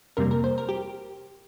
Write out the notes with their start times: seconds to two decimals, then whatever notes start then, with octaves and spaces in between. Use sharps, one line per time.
0.17 F2 C3 G3 A#3 A#4
0.31 A#4
0.44 C5
0.58 A#4
0.69 G4